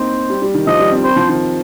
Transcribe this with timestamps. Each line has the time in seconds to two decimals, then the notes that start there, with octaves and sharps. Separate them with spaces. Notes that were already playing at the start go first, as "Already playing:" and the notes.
Already playing: A#3 C4 D#4 C5
0.30 G3
0.42 G3
0.54 D#3
0.67 F3 D#5
0.79 G3
0.92 C4
1.04 C4 C5
1.16 F3
1.29 D#3